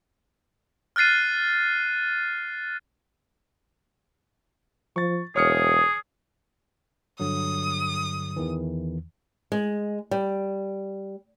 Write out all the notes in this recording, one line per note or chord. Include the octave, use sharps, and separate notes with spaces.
F6 F#6 A6 C7 D#7
F3 C#6 A6
E1 G#4 C#5 D#6 F6 C#7
G2 D3 F#3 D#6
E2 D#3 E3
G#3
G3